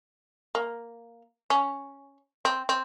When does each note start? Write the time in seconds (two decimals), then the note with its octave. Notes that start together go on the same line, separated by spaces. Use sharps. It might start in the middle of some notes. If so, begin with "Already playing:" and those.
0.55 A#3
1.50 C#4
2.45 C4
2.69 C4